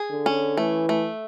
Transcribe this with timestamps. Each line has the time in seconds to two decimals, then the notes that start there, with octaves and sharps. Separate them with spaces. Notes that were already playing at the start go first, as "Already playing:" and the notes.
Already playing: G#4
0.10 D3
0.26 C#4
0.57 E3 A3
0.89 A3